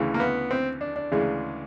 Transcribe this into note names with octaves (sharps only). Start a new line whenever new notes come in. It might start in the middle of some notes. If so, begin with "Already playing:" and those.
Already playing: D2 C#3 E3
A#3
B3
C4
D4
D4
D2 C#3 E3 G#3